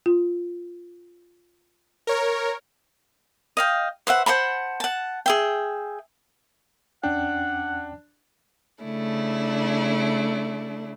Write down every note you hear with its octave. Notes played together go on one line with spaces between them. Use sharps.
F4
A#4 C#5
D#5 F5 G5
B4 C5 E5 F#5
C5 F#5 A5 B5
F#5 A5
G#4 E5 G5
E2 C#4 D4 F#5 G5
C#3 A3 D4 E4